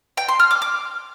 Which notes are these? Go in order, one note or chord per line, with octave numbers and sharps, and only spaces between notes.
G5
C6
F6
D6
D6